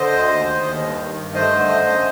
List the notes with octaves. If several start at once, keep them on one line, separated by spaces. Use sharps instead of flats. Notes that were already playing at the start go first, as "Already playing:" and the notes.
Already playing: D3 C5 D#5
D2
D#2
D#3
D#2
G2
D#3
G2
A3 C5 D#5
D3
F#2
F#2